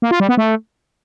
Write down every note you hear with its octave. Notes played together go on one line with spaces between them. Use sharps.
A#3
F4
G3
B3
A3